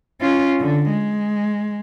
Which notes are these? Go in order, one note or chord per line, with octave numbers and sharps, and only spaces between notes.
C#4 F4
D3
G#3